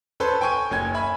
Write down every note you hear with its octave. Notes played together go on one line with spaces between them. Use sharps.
C#4 A4 B4 C5 A5
G5 G#5 C#6 D#7
F#1 C#4 G#5 G#6
E5 G#5 B5